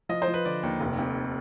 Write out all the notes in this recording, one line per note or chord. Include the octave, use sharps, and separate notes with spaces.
F3 D#5
C5
F3
B4
D3 D5
D#2
F1
F2